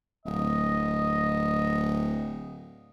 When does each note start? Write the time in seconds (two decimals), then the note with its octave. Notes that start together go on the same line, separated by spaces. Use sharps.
0.26 D1 D#5